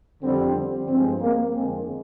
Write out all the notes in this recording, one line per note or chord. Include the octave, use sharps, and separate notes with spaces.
F2 D3 G3 C4
G2 F3 G#3 C4
A#3
F2 D3 G#3 C4